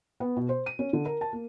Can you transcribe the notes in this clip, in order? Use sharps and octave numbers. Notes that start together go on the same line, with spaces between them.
B3
B2
C5
D#7
C#4
D3
A#4
A5
A#3